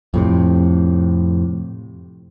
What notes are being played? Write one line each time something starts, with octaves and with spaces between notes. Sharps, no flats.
F2 A2 C3